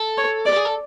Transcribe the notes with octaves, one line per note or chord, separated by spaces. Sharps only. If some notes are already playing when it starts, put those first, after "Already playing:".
Already playing: A4
C#5
G4 D5
G#4
A4